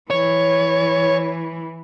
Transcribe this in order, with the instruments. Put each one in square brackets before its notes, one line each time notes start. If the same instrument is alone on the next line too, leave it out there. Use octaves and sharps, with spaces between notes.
[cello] E3 [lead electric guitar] C#5